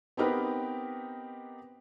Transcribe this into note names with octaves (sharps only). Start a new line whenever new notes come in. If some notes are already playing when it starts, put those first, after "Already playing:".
B3 C4 D#4 G4 A#4 B4